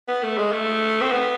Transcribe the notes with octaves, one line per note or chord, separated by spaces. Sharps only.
B3
A3
G#3
A3
C4
B3